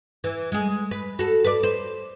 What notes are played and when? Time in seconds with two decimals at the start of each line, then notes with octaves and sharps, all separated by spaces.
0.24 E3
0.52 G#3 G#4
0.91 B4
1.19 F#4 A4
1.44 B4 D5
1.63 C5